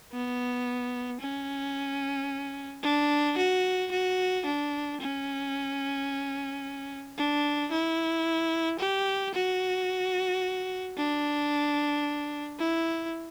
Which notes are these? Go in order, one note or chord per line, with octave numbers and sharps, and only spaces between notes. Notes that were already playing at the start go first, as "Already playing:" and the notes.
B3
C#4
D4
F#4
F#4
D4
C#4
D4
E4
G4
F#4
D4
E4